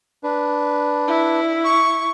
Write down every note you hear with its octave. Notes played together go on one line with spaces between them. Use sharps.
D4 B4
E4
C#6